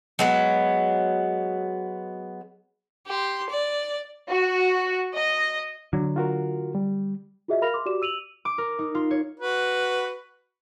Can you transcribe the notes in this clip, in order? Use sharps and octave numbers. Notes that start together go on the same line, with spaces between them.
F#3 G#3 B3
G4 C6
D5
F#4
D#5
D3 F#3
F4 F#4 A#4
G3
F4 F#4 G#4 D#5 E5
A#4 F5 B5 F6 A#6 F7
C6 D6
F#4 G4 D5 D6 E7
E6 D#7 F7 F#7
D6
A#4
D#4
F4
C#5
F#4 B4